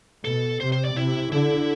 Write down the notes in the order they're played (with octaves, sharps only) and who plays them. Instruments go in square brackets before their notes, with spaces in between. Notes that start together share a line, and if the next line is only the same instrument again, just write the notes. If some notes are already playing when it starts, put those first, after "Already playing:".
[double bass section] B2 [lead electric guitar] A4
[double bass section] C3 [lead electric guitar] C5
[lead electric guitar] C5
D5
[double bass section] C3 [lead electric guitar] E4
[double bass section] D3 [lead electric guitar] E4